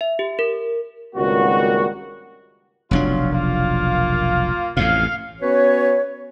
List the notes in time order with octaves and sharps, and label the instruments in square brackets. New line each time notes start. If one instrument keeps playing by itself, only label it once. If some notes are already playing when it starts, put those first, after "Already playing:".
[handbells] E5
G4
A#4
[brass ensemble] G#1 C#2 G3 A#3 F#4
[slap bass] F1 B1 D4 [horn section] F#3 C#4 F4
[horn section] A#3 F4
[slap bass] A1 F2 A2 [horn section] F5
[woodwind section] B3 C#4 F#4 B4 C#5